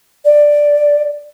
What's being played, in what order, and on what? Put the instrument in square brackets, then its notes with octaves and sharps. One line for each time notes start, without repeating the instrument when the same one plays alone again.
[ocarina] D5